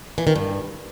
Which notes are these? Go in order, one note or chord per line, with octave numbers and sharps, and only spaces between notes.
E3
D#3
G2